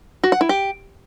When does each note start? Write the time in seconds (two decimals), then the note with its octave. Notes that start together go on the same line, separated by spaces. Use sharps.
0.24 F#4
0.32 F#5
0.41 E4
0.49 G4